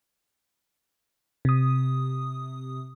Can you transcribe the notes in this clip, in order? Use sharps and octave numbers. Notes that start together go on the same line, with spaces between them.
C3 D#6